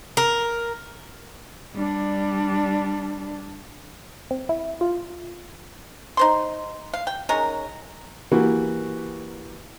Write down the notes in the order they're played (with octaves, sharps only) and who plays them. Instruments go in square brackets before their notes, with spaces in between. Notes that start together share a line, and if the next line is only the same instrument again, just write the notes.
[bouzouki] A#4
[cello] G3 D4
[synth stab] C4
E4
F4
[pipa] D#4 C5 C6
F5
G5
D#3 G#3 C#4 A#4
[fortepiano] E3 A#3 F#4 G4 B4